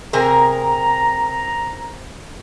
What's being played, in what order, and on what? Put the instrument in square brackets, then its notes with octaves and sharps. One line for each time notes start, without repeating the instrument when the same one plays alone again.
[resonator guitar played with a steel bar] C3 G#4 A#4 [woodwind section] A#5